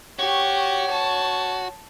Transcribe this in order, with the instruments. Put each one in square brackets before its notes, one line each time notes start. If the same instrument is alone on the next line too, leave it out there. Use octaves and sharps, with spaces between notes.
[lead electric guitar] F#4 [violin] G4 [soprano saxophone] C#5
[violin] A5